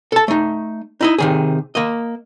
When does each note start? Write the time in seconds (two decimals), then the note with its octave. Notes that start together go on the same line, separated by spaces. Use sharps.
0.12 A4 A5
0.28 A3 D#4
1.01 D#4 E4 D#5
1.18 C3 D#3 G#4
1.75 A#3 D#5